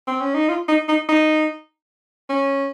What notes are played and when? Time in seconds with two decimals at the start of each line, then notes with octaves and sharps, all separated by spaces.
0.07 C4
0.21 C#4
0.34 D#4
0.49 F4
0.68 D#4
0.88 D#4
1.09 D#4
2.30 C#4